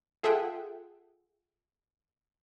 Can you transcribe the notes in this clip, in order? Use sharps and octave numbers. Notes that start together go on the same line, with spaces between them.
F4 G#4 A4 E5 F#5 G5